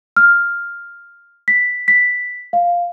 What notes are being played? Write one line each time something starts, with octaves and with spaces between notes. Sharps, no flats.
F6
B6
B6
F5